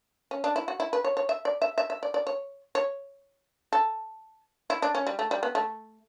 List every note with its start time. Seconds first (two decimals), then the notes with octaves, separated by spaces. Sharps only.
0.31 C#4
0.44 D4
0.56 E4
0.68 F#4
0.80 E4
0.93 B4
1.04 C#5
1.17 C#5
1.29 E5
1.45 D5
1.62 E5
1.78 E5
1.90 E5
2.03 D5
2.14 D5
2.27 C#5
2.75 C#5
3.73 A4
4.70 E4
4.82 D4
4.95 C#4
5.07 G3
5.19 A3
5.31 G3
5.43 B3
5.55 A3